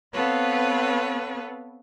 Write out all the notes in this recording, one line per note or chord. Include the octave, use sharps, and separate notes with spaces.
B3 C4 A4 B4 C#5 F5